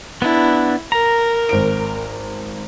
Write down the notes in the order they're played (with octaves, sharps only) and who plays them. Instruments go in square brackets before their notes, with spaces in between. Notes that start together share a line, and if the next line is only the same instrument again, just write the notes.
[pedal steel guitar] B3 D4 [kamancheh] E4
[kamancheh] A#4 [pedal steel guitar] A#5
[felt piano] G#1 C5 D7